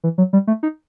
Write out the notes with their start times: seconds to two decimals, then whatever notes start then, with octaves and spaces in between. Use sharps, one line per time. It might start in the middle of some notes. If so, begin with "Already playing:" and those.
0.04 E3
0.18 F#3
0.33 G3
0.47 A3
0.63 D#4